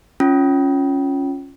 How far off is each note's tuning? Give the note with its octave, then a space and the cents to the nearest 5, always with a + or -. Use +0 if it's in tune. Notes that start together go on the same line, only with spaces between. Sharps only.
C#4 +0 F4 +0